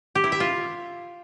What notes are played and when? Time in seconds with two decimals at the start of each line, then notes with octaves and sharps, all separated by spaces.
0.15 G4
0.24 E4
0.32 E5
0.40 F4